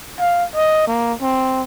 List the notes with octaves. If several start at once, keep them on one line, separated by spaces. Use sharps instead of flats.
F5
D#5
A#3
C4